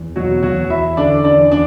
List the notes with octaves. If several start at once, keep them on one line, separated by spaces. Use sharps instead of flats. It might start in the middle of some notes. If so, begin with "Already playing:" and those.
Already playing: E2
B2 F#3 F#4
F#3 F#4
E2
E4 E5
D3 D4 D5
D4 D5
E2
D4 D5